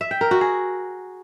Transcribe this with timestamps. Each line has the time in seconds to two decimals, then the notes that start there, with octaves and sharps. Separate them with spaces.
0.01 E5
0.11 G5
0.21 A#4
0.31 F#4
0.41 G#4